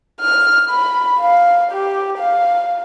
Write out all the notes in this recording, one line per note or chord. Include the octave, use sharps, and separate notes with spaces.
F6
B5
F5
G4
F5